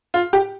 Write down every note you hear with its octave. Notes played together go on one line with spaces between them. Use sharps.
F4
G4